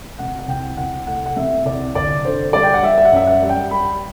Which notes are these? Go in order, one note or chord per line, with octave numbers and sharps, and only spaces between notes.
C3 F#5
F#5
C2 G5
C2 F#5
A3 F#5
F#5
C3 E5
C2 D5
G1 D5
D3 C5
G3 D5
G5
F#5
G3 E5
E5
F#5
F#2 E5
F#5
G3
G5
G3 B5